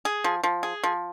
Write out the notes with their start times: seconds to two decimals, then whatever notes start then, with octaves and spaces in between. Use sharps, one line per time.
0.05 G#4
0.24 F3
0.43 F3
0.63 G#4
0.83 F3